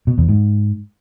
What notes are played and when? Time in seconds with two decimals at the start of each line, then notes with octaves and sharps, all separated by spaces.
0.07 B2
0.18 E2
0.29 G#2